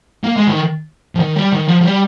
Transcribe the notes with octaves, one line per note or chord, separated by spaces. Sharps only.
A#3
G#3
D#3
F3
D#3
G3
D#3
F3
F3
G3